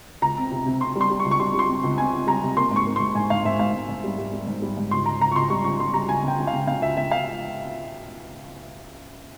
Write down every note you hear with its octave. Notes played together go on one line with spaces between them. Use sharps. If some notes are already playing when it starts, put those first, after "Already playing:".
C#2 A#5
C4
C3
C3
C4 C6
G3
C6
G3
C#6
C#2
C#6
G3 C6
G3 C6
C4
C#2
C4 G#5
C4
G3 A#5
C3
A#3 C6
G#2
C#6
A#3
G#2 C6
G#2 G#5
G#2 F5
G#2 E5
G#2 F5
G#2
G#2
G3
G3
G3
G#2
G3
G#2
C#2 C6
C#2 A#5
C#3 A#5
C#6
C#2 C6
G3 C#6
C#3 C#6
G3 C6
G3 A#5
C#2 G#5
C#3 G5
C#3
F5
C#3
C#3 F5
C#2 E5
C#2 E5
F5